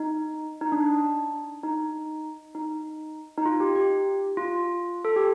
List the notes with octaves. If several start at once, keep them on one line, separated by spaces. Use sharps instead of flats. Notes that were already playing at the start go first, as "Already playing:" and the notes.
Already playing: D#4
D#4
D4
D#4
D#4
D#4
F4
G4
G4
F4
A4
G4